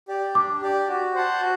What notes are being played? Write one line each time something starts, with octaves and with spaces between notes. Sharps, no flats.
G4 D5
D4 D6
G4 D5
F#4
C5 F#5 A5
F#4